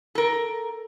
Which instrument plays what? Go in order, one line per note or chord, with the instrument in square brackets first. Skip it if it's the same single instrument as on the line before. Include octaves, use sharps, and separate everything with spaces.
[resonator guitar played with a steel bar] A4 A#4